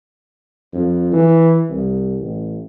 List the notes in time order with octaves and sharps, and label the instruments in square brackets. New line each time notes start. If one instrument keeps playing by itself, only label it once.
[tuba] F2
E3
C2
A1